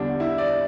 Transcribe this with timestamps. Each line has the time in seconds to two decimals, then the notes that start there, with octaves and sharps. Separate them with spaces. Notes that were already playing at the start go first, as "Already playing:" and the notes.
Already playing: E2 D3 G3 D4
0.20 E4
0.38 D5